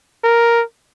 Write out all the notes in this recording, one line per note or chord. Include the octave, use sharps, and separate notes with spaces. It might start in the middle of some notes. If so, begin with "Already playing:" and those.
A#4